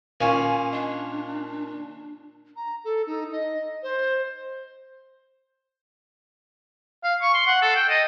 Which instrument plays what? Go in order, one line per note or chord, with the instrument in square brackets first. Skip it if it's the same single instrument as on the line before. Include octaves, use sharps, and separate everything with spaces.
[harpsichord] A#2 C#4 [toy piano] F5 [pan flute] G#5
[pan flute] D4 [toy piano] D#5
[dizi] A#5
A4
D#4
D#5
C5
[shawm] F5
C#6
C6
F#5
A4
G5
D#5